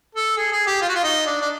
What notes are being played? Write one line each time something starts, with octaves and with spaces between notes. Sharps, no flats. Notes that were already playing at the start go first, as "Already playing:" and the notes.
A4
G#4
G#4
G4
F4
F#4
F4
D#4
D4
D4